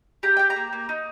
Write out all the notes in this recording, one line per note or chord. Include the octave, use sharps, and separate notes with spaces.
G4 A#5
G4 G5
A#5
A#3
A#3
D#4